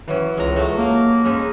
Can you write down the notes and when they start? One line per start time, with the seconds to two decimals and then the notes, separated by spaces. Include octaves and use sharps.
0.08 E3 F#3 C#4
0.37 C#2 G#3 A#5
0.56 F#3 A3
0.78 A#3
1.24 G#3 C#4 D#4